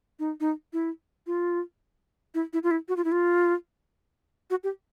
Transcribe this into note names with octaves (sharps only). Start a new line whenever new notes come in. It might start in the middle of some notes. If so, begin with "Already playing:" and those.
D#4
D#4
E4
F4
E4
E4
F4
E4
F#4
F4
E4
F4
F#4
G4